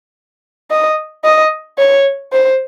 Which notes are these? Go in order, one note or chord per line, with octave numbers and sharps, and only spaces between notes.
D#5
D#5
C#5
C5